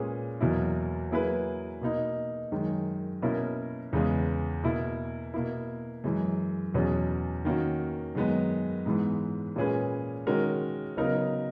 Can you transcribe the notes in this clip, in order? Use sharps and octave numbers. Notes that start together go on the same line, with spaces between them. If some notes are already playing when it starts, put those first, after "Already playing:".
Already playing: A#2 G#3 C#4 G#4 B4
E2 B2 F#3 A#3 E4
F#3 A#3 E4 G#4 B4
B2 A#3 D#4
F#2 D#3 G#3
B2 A#3 C#4 E4 A#4
E2 C#3 G#3 B3
B2 A#3 E4
B2 A#3 E4
F#2 E3 G#3
E2 B2 F#3 C#4 G#4
D#3 A#3 C#4 F#4
F#2 D#3 G#3 B3 D#4
G#2 E3 G#3 B3
A#2 G#3 C#4 G#4 B4
D#3 G#3 C#4 F#4 A#4
C#3 F#3 B3 D#4 A#4